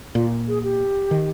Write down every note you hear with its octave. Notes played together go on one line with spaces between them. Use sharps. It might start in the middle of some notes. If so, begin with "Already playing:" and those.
A#2 F4
G#4
G4
D#3